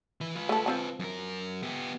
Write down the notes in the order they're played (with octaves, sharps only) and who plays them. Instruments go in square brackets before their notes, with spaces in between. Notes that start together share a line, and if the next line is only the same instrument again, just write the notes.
[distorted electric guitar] E3 B4
F4 B4
[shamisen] A3 A4
F3 C4 A5
[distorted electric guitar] F#2 A#4
B3 G4